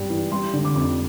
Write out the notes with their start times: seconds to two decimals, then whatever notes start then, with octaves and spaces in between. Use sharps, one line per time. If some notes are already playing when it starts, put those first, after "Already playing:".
Already playing: G2 G3
0.10 E3
0.31 G3 C6
0.53 D3
0.65 D6
0.75 F2